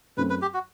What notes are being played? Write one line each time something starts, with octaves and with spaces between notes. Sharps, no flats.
F#2 F#3 A3 C4 B4
B4
G4
F#4